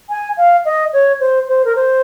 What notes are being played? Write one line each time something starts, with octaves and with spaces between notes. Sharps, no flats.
G#5
F5
D#5
C#5
C5
C5
A#4
C5